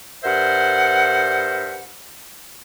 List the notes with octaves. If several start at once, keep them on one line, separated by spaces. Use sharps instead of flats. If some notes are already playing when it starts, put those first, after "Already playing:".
G2 A#4 C5 E5 F#5